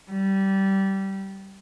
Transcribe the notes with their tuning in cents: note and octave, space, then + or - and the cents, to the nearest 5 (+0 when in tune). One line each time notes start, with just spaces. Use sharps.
G3 -15